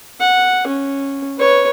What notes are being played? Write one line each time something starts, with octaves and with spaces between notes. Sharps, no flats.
F#5
C#4
B4 C#5